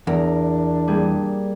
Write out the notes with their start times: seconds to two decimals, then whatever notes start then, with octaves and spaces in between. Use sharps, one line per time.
0.07 E2 D4 A#4
0.87 A#2 G3 G#4